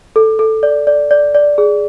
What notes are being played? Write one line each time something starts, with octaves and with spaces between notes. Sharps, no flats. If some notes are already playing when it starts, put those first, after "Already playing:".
A4
A4
D5
D5
D5
D5
G#4